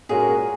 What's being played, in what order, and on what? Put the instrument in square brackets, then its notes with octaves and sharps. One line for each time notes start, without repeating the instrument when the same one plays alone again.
[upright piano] A#2 G#3 C#4 F#4 A#4 [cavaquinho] G#4